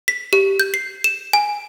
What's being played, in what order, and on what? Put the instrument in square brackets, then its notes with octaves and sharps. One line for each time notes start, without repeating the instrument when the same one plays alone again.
[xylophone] B6
G4
G6
C7
E7
G#5